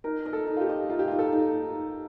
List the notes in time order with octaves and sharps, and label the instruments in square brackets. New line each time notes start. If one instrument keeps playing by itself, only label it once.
[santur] D#4 [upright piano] A#4
[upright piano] A#4 [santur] D#5
[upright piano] A4
[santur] D#4
[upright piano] F4
G4
[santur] D#5
[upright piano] F4 [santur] A#4
[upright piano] G4
[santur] D#4 [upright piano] F4
[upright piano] A4
[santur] D#4